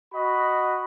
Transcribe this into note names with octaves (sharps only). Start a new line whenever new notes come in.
F#4 D#5 B5